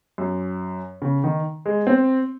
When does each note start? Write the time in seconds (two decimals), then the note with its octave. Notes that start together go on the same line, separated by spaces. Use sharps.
0.18 F#2
1.02 C#3
1.24 D#3
1.66 G#3
1.87 C4